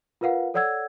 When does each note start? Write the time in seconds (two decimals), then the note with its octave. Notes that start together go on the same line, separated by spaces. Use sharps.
0.21 F4 A#4 B4 F5 F#5
0.54 A4 C#5 D5 F#5 E6 G#6